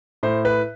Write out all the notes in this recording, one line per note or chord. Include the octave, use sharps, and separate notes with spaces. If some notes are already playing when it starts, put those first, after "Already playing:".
A2 C5
B4